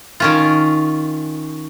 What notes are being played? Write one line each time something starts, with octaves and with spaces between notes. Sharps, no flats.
D#3 C#4 F4